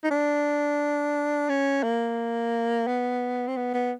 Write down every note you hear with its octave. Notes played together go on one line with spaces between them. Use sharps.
D#4
D4
C#4
A#3
B3
C4
B3
B3